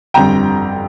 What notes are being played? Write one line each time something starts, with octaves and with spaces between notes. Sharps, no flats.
G1 F2 D3 G3 G5 A#5